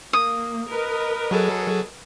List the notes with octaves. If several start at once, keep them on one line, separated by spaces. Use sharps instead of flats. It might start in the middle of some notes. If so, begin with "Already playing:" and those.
A#3 D#6
A#4 B4 D#5
F#3 G#4 A4